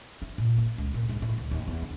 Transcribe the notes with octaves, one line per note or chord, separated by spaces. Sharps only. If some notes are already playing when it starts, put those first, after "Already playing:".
E4
A#2
A#3
C#2
A#2
G#2
A2
D2
D#2
E2
D3